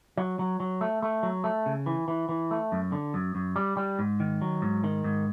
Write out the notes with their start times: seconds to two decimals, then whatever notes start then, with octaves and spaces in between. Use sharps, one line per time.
0.17 F#3
0.39 F#3
0.60 F#3
0.81 A3
1.02 A3
1.23 F#3
1.44 A3
1.66 C#3
1.86 E3
2.08 E3
2.29 E3
2.51 A3
2.72 F#2
2.92 D3
3.14 F#2
3.35 F#2
3.56 G3
3.77 G3
3.99 G#2
4.20 D#3
4.42 F#3
4.62 G#2
4.84 D#3
5.04 G#2